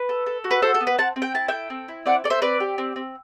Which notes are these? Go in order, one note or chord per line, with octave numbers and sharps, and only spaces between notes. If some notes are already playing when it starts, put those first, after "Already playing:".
Already playing: B4
A4
A4
F#4
B4
F#4 A4 C5
A4
B3
B4
C4 F#5 A5
C4
G5
E4 A5
A4 E5 G5
C4
E4
C4 D5 F#5
A4 D5
C5 E5
C4 B4 D5
G4
C4
C4